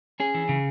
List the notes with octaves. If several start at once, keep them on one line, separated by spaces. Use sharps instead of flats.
C#4 G#4
E3
C#3